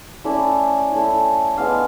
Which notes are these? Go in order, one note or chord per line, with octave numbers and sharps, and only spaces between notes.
A3 C#4 E4 D5
A3 C#4 E4
G#3 B3 D4 F5